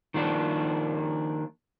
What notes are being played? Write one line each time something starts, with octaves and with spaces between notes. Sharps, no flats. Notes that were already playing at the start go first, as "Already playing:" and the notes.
D#3 F3 A#3 D4